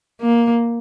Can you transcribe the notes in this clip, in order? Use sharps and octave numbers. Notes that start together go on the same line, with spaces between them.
A#3